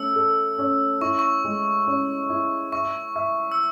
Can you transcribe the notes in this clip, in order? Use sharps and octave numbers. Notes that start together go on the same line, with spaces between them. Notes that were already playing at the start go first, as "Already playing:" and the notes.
Already playing: A3 C#4 E6
A4
C#4
E4 C#6
C#6
G#3
C#4
E4
E5 C#6
E5
E6